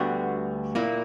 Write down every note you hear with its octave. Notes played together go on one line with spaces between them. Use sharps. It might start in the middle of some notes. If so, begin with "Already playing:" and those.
Already playing: D2 D3 G3 B3 F#4
A#2 A#3 E4